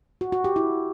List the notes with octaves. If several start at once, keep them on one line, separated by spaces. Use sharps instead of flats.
F#4
F#4
G4
E4